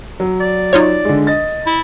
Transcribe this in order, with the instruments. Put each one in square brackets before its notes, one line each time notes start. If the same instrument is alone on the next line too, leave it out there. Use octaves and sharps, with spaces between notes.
[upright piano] F#3
[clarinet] D5
[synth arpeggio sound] D#4 F4 C#5
[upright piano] D3 G#3
D#5 A6
[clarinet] E4